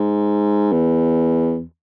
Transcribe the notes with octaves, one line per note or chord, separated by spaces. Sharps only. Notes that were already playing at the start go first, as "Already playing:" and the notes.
Already playing: G#2
E2